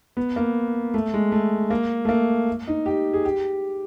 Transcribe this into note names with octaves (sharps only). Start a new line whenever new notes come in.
B3
A#3
A3
G#3
A3
A#3
A3
A#3
D#4
G4
G#4
G4